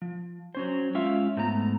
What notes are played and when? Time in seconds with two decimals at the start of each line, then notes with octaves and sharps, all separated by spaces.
0.02 F3
0.55 F#3 C#4 C5
0.94 G#3 C#4 F4 E5 F5
1.37 G#2 A3 B3 A4 A#5